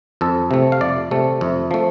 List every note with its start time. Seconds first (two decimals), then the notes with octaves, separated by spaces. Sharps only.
0.21 F2 A4
0.51 C3 A3
0.72 F5
0.81 F2 D5
1.11 C3 A3
1.41 F2
1.71 F3 A3